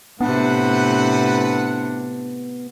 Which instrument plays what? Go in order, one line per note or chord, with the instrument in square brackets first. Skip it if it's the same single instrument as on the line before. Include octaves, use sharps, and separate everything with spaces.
[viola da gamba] A2 C3 [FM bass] B3 [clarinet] D4 [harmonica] B4 F#5